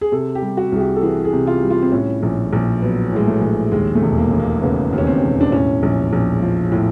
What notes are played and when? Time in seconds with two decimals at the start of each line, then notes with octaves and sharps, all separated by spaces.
0.01 G#4
0.12 C3 A4
0.35 G4
0.42 G3
0.57 F#4
0.72 C2 G#4
0.80 G4
0.96 A4
1.03 E3 G#4
1.25 G#4
1.33 C3
1.47 F4
1.63 G3
1.70 F4
1.82 C4
1.92 A2 C#4
2.23 A#1
2.53 A#1
2.82 F#3 B3
3.13 A2 G#3
3.27 A3
3.42 A#1
3.72 D#2 G#3
3.95 A3
4.02 E1
4.18 A#3
4.32 E1
4.39 A#3
4.62 C#3 B3
4.93 D#2
4.98 C#4
5.07 C4
5.23 E1
5.41 D4
5.52 A2 C#4
5.83 A#1
6.13 A#1
6.42 F3
6.72 A2